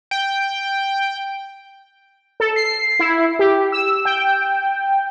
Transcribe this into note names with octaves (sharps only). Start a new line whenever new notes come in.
G5
A4
C7
E4
G4
E6
G5